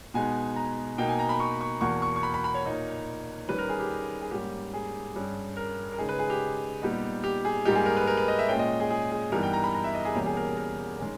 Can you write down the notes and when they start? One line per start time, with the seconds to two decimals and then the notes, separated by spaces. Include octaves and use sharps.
0.14 B2 G#3 B3 D#4 G#5
0.56 A#5
0.98 B2 A#3 D#4 G5
1.09 G#5
1.19 A#5
1.29 B5
1.40 C#6
1.61 C#6
1.81 E2 B2 A#3 C#6
2.02 C#6
2.16 C#6
2.23 B5
2.34 B5
2.44 B5
2.54 C#5
2.65 A#2 A#3 D#4
3.48 D#3 G3 C#4 B4
3.58 A#4
3.69 G#4
3.80 G4
4.21 G#4
4.31 G#2 G3 A#3 C#4 G4
4.74 G#4
5.16 G2 G3 C#4
5.57 A#4
5.93 A#4
5.98 C#3 G#3 D#4 G#4
6.09 B4
6.19 G#4
6.30 G4
6.82 A#2 G3 B3 D#4
7.24 G4
7.45 G#4
7.65 G#2 G3 A#3 D#4 G4
7.75 G#4
7.86 A#4
7.97 B4
8.07 A#4
8.17 B4
8.28 D#5
8.39 E5
8.49 A#2 G#3 C#4 G5
8.59 D#5
8.80 G#4
8.90 G#4
9.11 G#4
9.32 G2 E3 G3 B3 D#4 A#4
9.43 G5
9.53 A#5
9.64 B5
9.74 A#5
9.84 E5
9.95 D#5
10.05 G#4
10.15 E2 B2 G3 A#3 C#4 G4
10.26 G#4
10.37 A#4
10.57 A#4
10.99 D#3 G#3 C#4